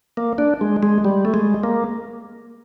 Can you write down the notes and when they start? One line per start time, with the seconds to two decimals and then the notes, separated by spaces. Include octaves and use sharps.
0.17 A#3
0.38 D4
0.61 G#3
0.83 G#3
1.05 G3
1.25 A3
1.34 G#3
1.63 A#3